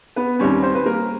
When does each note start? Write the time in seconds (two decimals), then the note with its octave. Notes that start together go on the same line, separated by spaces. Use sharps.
0.16 B3 B4
0.39 D#2 D#3 G3 C4 C#4 C#5
0.63 C4 C5
0.75 B4
0.86 A#3 A#4